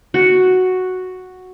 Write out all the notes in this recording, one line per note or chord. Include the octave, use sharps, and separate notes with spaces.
F#4